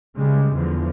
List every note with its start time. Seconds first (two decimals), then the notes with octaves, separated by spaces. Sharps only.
0.17 C#3 G3 G#3
0.54 E2 D3 F3